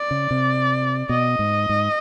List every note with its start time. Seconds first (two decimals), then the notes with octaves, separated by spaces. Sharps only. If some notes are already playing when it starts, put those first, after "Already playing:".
Already playing: D5
0.11 C#3
0.31 C3
1.09 B2 D#5
1.39 G#2
1.69 G#2